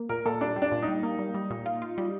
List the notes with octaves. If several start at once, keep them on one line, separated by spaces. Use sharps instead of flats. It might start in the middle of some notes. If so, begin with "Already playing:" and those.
Already playing: A#3
A#2 A#4
A#2 A4
G3 D4
G3
D4
A#2
D#4
G3
A#3
G3
G3
A#2
F4
F4
G3